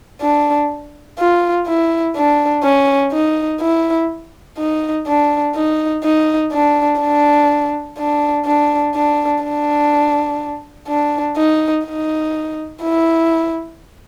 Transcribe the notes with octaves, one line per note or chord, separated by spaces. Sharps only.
D4
F4
E4
D4
C#4
D#4
E4
D#4
D4
D#4
D#4
D4
D4
D4
D4
D4
D4
D4
D#4
D#4
E4